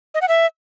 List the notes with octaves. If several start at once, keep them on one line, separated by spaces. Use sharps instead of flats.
D#5
F#5
E5